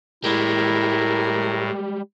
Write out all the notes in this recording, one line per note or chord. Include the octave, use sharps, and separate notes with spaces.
A2 G3 G#3 E4 A#4